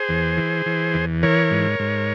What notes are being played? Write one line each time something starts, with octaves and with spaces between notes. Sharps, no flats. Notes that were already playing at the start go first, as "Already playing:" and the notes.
Already playing: G#4 C5
E2
E3
E3
E2
E3 A#4 C#5
G#2
G#2